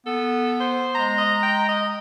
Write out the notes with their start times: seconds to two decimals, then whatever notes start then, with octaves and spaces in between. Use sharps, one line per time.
0.06 B3 A4
0.60 C5
0.95 G#3 A#5
1.18 D#5
1.43 G5
1.68 D#5